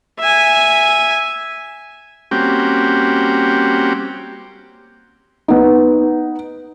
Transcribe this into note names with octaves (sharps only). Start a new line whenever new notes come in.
E5 G#5
G3 A#3 C4 C#4 F#4 G4
B3 D#4